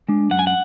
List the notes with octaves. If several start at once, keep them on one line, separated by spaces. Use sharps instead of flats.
G#3 D4
F#2 F#5
G#5
F#5